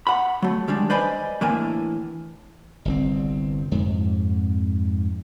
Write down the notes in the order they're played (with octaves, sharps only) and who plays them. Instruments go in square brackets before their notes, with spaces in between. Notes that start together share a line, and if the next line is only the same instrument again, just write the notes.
[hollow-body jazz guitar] F#5 B5
F#3 A3
D#3 G3 G#3 D4
B4 C5 D5 D#5 G#5 B5
A2 E3 A#3 D4 A#4 G#5
[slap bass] G1 C2 C4
F2 G#2